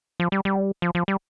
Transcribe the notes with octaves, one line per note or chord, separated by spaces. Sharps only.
F3
G3
G3
F3
F3
G3